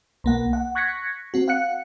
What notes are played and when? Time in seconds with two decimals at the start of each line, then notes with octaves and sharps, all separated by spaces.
0.24 B1 A#3 F#5
0.53 F#5
0.75 C#6 F#6 G#6 A#6 B6 C#7
1.34 C4 F#4
1.48 F5 F#5 F#6 C#7